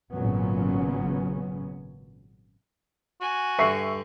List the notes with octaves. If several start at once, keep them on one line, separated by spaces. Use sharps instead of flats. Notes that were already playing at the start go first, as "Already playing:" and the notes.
G#1 A#2 C#3 F#3 B3 C#4
F#4 G#5
G2 D3 E5 C#6 C7